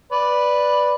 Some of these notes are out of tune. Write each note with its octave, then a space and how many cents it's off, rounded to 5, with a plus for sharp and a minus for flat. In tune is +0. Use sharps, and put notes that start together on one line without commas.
B4 +0 D5 +0